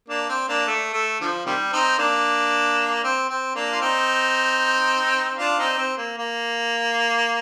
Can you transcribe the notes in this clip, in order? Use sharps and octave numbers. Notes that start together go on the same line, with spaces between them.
A#3 D4
C4
A#3 D4
A3
A3
D3 F3
C3 D#3 G3
C4 D#4
A#3 D4
C4
C4
A#3 D4
F4
C4 D#4
D4 F4
C4 D#4
C4
A#3
A#3